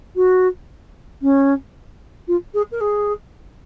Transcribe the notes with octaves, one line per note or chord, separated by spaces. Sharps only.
F#4
C#4
F4
G#4
A#4
G#4